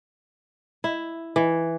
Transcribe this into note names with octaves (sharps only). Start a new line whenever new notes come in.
E4
E3